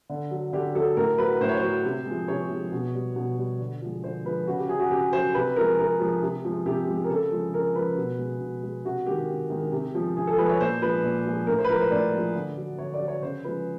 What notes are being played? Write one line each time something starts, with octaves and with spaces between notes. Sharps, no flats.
D3
F#3
D3 G4
F#3 A4
A2 A#4
F#3 B4
A2 C5
C#5
C5
F#3
C3
F3 G#3
C3 C#5
F3 G#3
B2
G3
B2
G3
D3
F3 G#3
D3 C5
F3 G#3 B4
C#3 F#4
G4
F#3 G#4
F#4
C#3 G4
F#3 C5
C3 B4
F3 G#3 A#4
C3 A#4
F3 G#3
C3
F3 G#3
C3 G4
F3 G#3
A#4
C#3 A4
F3 G#3
C#3 A#4
F3 G#3 B4
B2
G#3
B2
G#3
C3 F#4
D#3 G#3 G4
C3
D#3 G#3
C3
F3 G#3
C3 G#4
A4
F3 G#3 B4
C#5
A#2 C5
F3 G#3 B4
A#2
F3 G#3
A2 A#4
C5
B4
F3 G#3 A#4
C5
A2 D5
F3 G#3
D3
F#3
D3 C#5
D5
F#3
C#5
C#3 C5
F3 G#3 B4